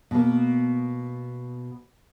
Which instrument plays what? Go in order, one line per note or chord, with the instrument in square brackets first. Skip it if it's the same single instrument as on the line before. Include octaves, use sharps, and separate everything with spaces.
[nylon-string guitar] B2 A#3